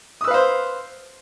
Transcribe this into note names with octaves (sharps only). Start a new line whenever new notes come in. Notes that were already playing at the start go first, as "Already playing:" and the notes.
B4 C5 F5 D#6 E6